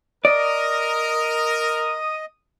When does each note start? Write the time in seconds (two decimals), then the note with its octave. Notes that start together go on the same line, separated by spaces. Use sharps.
0.25 A#4 D5 D#5 D#6